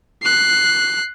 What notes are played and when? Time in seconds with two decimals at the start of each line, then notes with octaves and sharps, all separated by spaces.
0.23 F#6 C7